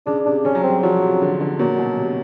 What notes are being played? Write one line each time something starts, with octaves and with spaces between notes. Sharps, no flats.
C#3 D4
C3 D4
C#3 C#4
F#3
G3 C4
F3 F#3
C3
D3
D3
A#2 F#3
B2
C3